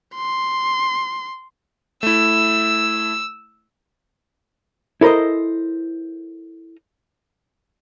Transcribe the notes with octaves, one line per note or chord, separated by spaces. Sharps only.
C6
A3 E4 E6
E4 A4 A#4 C5 D#5